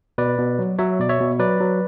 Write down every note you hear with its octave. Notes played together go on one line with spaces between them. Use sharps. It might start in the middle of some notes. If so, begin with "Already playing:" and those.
B2 B4 D5
B2
F#3
F#3 C#5 E5
B2 D5
C#5 E5
B2
F#3 B4 D5
F#3